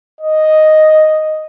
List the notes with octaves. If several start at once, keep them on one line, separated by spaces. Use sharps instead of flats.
D#5